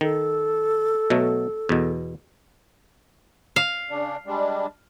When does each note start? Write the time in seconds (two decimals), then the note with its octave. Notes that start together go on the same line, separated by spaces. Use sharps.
0.01 D#3 A4
1.10 B2 F#3 A3
1.69 E2 B2
3.56 F5
3.90 C#3 D4
4.26 G3 G#3 D4